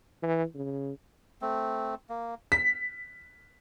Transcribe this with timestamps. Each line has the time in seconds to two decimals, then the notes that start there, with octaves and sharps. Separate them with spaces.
0.23 E3
0.54 C#3
1.42 A3 C4
2.09 A#3
2.52 B6